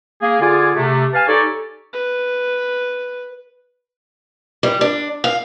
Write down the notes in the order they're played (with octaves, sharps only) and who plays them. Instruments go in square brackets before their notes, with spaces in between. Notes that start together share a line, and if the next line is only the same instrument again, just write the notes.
[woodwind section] A#3 G#4
D3 F4 G#4 D5 G#5
C3 A3
B4 F5 G#5 A5
D#4 G4 A4 C#5 D5 G#5
[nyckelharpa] B4
[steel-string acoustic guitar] G3
D4
F5